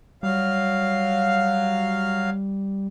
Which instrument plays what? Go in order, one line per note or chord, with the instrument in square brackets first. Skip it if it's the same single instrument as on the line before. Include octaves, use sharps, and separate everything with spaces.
[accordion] F#3 F5 [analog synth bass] G3